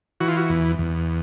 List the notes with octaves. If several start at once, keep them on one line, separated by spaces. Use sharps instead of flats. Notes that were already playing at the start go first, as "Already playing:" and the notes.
E3 F#4
F4
F#4
E2
E2